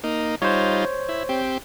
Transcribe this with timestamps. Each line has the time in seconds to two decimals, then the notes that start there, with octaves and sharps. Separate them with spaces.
0.04 A#3 D#4
0.42 G3 D#4 F4 C5 C#5
1.09 E4
1.29 C4 G4